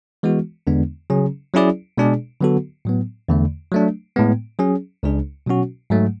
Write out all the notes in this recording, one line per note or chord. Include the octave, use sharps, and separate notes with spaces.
E3 G#3 B3 F#4
E2 D3 G#3 B3 D4
C#3 F#3 C#4 G#4
F#3 C#4 E4 G#4 D5
B2 G#3 D4 G#4 D5
D3 F#3 B3 F#4 A4
A2 F#3 B3
E2 D3 A3
F#3 A3 D4
A2 G#3 B3
F#3 C#4 G#4
C#2 C#3 G#3 D4 G#4
B2 F#3 C#4 F#4
G#2 F#3 A3